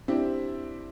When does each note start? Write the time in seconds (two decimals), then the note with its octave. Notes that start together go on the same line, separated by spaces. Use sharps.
0.08 C4 D4 E4 G4